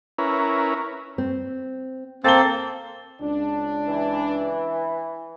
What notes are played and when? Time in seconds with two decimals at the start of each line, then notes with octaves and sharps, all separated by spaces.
0.18 C#4 E4 A#4 B4
1.18 C4
2.24 A#3 C4 A4 A6 G7
3.21 C#2 D4
3.88 E3